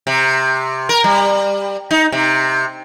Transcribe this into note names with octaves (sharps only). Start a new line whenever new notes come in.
C3
A#4
G3
D#4
C3